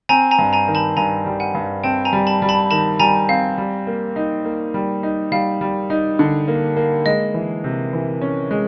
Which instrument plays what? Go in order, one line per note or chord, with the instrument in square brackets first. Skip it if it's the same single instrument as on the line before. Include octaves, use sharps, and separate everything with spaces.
[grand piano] C4 [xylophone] G#5 A#5
[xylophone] G#5 A#5
[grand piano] G2
[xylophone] G#5 A#5
[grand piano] D#3
[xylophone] A5 B5
[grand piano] G2 [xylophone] G#5 A#5
[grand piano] G3
[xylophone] F#5 G#5
[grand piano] G2
[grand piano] C4 [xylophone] G5 A5
[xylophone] G#5 A#5
[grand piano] G3
[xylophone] A5 B5
[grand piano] G3
[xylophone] A5 B5
[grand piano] D#3 [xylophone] A5 B5
[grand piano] G3 [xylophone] G#5 A#5
[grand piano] C4 [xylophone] F5
[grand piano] G3
A#3
D#4
A#3
G3
D#4
[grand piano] G3 [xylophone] F5
[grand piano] G3
D#4
D3
A#3
A#3
[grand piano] G#3 [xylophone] D#5
[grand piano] E3
C3
E3
C#4
G#3